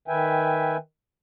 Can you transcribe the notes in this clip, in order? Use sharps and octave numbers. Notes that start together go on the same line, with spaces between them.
D#3 B4 E5 G5 G#5